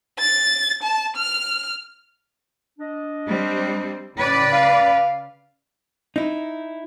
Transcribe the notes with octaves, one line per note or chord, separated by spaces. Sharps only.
A6
A5
F6
D4 D#5
G3 C4
A2 C#3 B4 D5
F5
D#4 E4